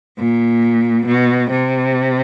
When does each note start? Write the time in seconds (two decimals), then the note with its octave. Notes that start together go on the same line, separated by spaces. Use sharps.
0.19 A#2
1.06 B2
1.50 C3